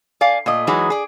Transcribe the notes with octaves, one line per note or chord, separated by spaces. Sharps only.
D5 F5 G#5
A#2 A3 D#5
E3 F#3 G#3 D#4 G#4
G#4 D5